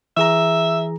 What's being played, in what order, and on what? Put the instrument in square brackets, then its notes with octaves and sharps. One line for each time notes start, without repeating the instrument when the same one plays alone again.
[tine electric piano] E3 G#4 A#5 [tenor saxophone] E5